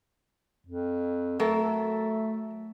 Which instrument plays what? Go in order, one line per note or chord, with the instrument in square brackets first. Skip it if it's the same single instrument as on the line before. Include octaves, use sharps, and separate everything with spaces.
[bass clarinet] F2
[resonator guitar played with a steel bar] F#3 A4 A#4 [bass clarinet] A3